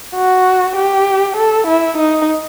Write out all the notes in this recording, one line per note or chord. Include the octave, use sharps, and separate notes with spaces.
F#4
G4
A4
E4
D#4